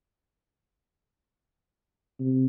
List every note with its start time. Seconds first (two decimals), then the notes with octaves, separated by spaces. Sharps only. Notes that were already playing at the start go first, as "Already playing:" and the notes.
2.20 C3